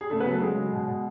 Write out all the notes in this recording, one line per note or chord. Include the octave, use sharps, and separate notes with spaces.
G#4
C#3 A3 A4
B3 B4
F#3
A3 A4
C#3 G#3 G#4
F#3
B2
B2